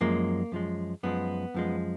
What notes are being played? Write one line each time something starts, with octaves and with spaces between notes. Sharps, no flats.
F#2 F3 G#3 A#3
F#2 F3 G#3
F#2 F3 G#3 B3
F#2 F3 G#3